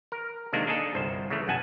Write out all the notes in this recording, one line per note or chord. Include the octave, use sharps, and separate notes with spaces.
A#4
C3 D#3 G#3 A#3 D4
D4 D#4 G#4 A4
G1 C2 C5
C#3 E3 A3
B1 F#2 F#5 G#5 A5